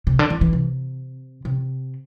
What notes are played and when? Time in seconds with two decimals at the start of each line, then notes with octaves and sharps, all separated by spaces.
0.07 C3
0.19 D3
0.30 E3
0.41 E3
0.53 C3
1.45 C3